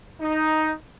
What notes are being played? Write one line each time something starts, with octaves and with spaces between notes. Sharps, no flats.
D#4